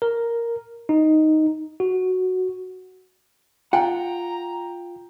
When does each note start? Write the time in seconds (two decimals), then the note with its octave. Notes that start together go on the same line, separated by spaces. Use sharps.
0.02 A#4
0.89 D#4
1.80 F#4
3.73 F4 F#5 G5 A#5